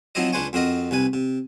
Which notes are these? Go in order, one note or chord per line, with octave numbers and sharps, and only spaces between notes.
F3 F#3 C4 D#4 E4 D#5
C#2 D4 B4 C5 G#5 C#6
F2 C4 F#4 A#4 D#5
C2 C3 B4 G#5
C3